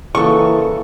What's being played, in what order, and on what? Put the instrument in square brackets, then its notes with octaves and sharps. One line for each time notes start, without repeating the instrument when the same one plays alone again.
[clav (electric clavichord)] C#3 A#3 F#4 [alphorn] E3 [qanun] A4 D#5 [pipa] C#6